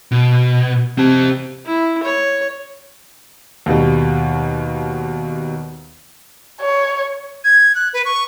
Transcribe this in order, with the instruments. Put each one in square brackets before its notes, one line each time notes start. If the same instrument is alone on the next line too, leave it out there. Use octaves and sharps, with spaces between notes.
[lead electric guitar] B2
[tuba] C3 [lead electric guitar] C4 A5
[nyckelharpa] E4
C#5
[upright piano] D#2 B2 G3
[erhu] C#5
[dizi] G#6
F#6
B4
C#6